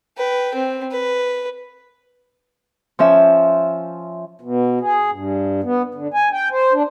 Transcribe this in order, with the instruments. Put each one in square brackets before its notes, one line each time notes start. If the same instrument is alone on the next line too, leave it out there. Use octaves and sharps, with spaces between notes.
[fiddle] B4 G5
C4
B4
[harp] F3 C#4 E5
[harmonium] B2
G#4
G2
B3
D3
G#5
G5
C5
D4